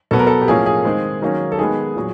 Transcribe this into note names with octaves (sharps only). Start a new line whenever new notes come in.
B2 F#3 B3 A4
A#4
A4
G4
A2 F3 A#3 C#4 G#4
G#4
D#3 G#3 C4
D#3 F#3 A#3 C#4
A4
D#3 G#3 B3 G#4
A#2 F#3